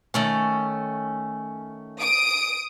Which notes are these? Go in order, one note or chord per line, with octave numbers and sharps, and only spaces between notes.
D#3 A3 C#4
D#6 D7